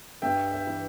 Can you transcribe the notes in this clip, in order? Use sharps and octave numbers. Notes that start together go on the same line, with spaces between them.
G2 E5 G5
E5 G5
E3